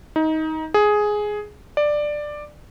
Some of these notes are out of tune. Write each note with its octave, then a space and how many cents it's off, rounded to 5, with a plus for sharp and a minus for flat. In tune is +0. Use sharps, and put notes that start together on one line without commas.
D#4 +20
G#4 +5
D5 +10